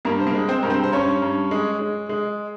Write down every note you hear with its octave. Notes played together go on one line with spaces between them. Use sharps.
G2 A#3 A#4
C5
A#3 A#4
G#3
C4 C5
G2 A#4
C4 C5
C5
G2 C#4 C#5
G2
G#3
G#3
G#3